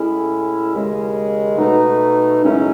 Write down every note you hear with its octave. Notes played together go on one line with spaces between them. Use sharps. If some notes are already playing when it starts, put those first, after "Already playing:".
Already playing: A2 G#3 C#4 E4
D#2 C#3 G#3
B2 A3 D#4
F#2 C#3 G#3 C#4 E4